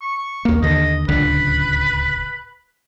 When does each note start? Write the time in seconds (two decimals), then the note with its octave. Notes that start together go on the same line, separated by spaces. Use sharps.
0.01 C#6
0.45 D#2 A#3
0.62 D#2 D3 D#5
1.09 D1 C#2 D3 B4